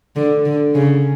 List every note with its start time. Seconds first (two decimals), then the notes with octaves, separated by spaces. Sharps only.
0.16 D3
0.46 D3
0.75 C#3